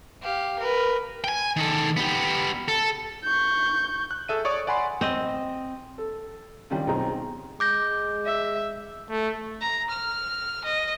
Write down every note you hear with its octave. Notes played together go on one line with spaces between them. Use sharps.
G4 F5
A#4 B4
G5 G#5
D#3 A4
B3 G4
A4
C#6 G6
F#6
G#4 A4 E5 D#7
C#5 D5 C#6 D#6
D5 F#5 G#5 B5 C6
C4 D#5
A4
D#3 G3 C#4 F4
B1 C4 D#4 G#4 A#5
G#3 D6 G6 A#6
E5
A3
A#5
F6
D#5